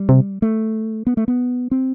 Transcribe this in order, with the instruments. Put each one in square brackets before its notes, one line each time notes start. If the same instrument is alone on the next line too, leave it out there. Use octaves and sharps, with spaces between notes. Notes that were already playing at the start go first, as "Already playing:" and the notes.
Already playing: [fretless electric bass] G3
[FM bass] C3
[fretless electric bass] A3
B3
A3
B3
C4